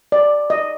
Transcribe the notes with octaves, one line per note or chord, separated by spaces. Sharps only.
D5
D#5